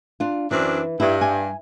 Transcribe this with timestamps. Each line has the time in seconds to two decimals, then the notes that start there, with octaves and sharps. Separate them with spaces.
0.20 D4 F4
0.51 F#2 E3 C4 D4
1.00 G2 E4
1.21 G#5